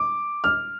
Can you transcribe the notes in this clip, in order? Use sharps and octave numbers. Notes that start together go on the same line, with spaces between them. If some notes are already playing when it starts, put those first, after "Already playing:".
Already playing: D6
F6